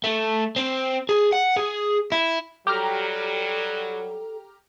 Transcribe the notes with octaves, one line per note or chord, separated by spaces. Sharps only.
A3
C4
G#4
F#5
G#4
E4
F#3 G3 G4 A4 A#5 F6